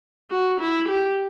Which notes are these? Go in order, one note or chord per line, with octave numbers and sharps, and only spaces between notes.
F#4
E4
G4